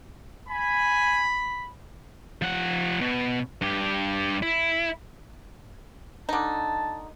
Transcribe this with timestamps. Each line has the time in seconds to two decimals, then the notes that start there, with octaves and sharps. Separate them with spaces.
0.49 G#5 B5
2.42 F3 F#5
3.01 B2
3.62 G2 G4
4.43 E4
6.29 D3 D#4 A5